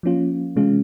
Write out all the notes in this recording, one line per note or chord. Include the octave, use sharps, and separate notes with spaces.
F3 A#3 C#4 F4
C3 E3 G#3 C#4 F4